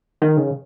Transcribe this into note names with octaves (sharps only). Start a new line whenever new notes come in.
D#3
C#3